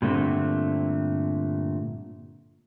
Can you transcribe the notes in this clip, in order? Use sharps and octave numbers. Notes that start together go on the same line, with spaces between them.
G2 A#2 D3 A3 C4